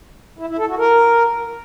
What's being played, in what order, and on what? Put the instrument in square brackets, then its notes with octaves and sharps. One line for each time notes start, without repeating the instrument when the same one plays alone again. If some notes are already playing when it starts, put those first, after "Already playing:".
[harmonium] E4
E4
A4
F#4
A#4